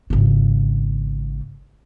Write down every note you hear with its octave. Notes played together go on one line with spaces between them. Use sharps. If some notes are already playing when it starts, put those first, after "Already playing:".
G#1 C#3